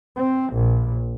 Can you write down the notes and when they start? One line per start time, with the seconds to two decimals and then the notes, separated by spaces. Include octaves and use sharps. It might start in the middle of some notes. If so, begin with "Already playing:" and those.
0.16 C4
0.53 A#1